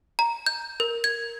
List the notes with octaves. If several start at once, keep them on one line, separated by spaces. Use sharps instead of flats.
A#5
G6
A#4
G#6